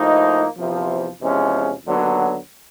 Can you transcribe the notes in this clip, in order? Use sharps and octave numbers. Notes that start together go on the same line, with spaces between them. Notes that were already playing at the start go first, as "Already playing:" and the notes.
Already playing: A2 F3 A#3 D#4
E2 C3 F3
E2 C3 F3 G#3 C#4
D#2 D3 F#3 B3